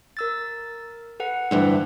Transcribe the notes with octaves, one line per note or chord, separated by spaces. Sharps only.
A#4 E6 A6
A4 B4 F#5
D2 G2 E3